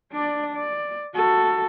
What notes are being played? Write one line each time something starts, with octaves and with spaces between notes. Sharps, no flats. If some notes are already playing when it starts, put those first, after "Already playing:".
D4 D5
D5
F#4 A4